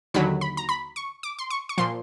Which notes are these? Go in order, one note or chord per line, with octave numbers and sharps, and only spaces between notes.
D#2 D3 F#3 B5
B5
A#5
B5
C#6
D6
C6
C#6
C#6
A#2 F3 C6